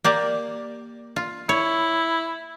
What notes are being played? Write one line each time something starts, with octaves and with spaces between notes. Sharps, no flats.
A#3 G4 D5
F4
E4 C#5